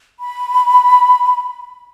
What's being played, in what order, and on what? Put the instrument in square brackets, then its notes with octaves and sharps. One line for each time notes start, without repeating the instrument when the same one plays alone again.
[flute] B5